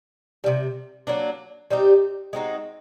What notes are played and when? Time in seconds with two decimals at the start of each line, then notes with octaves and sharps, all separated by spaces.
0.44 C3 D#3 G3
1.07 F#3 A#3 D4
1.71 G3 C4 D#4 G4
2.33 G#3 C4 D#4 F#4